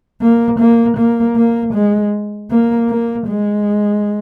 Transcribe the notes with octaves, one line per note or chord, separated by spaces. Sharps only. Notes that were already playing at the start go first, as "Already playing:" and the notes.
A#3
A#3
A#3
A#3
G#3
A#3
A#3
G#3